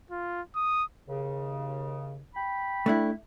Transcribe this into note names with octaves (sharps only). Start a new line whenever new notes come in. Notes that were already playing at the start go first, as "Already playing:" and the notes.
F4
D#6
D#2 C#3
G5 B5
A3 D4 E4